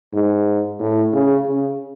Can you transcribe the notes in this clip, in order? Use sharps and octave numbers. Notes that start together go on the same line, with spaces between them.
G#2
A2
C#3
C#3